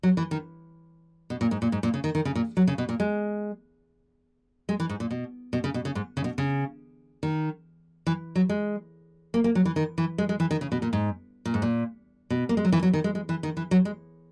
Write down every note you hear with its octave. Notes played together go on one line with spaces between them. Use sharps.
F#3
E3
D#3
B2
A#2
G#2
A#2
G#2
A#2
C#3
D#3
D#3
C#3
A#2
F#3
C#3
B2
A#2
G#3
G#3
E3
G#2
A#2
B2
B2
C#3
B2
C#3
G#2
C#3
B2
C#3
D#3
E3
F#3
G#3
A#3
A#3
F#3
E3
D#3
E3
G#3
G#3
E3
D#3
C#3
B2
A#2
G#2
A#2
G#2
A#2
B2
A#3
G#3
F#3
E3
F#3
D#3
G#3
G#3
E3
D#3
E3
F#3
G#3